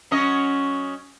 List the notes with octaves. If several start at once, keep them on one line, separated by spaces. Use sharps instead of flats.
F#3 C#4 D#5